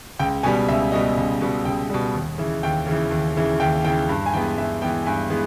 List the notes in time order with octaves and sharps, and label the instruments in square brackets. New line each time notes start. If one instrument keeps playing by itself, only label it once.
[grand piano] C#2 G5
B2 G3 G#5
C#2 E5
B2 G3 D#5
C#2
B2 G3
C#2 G5
B2 G3
D#2
C#3 E3
D#2 G5
C#3 E3
D#2
C#3 E3
D#2 G5
C#3 E3 G5
G2
G#5
E3 G#3 B3 G5
G2 E5
E3 G#3 B3 G5
G2 G#5
E3 G#3 B3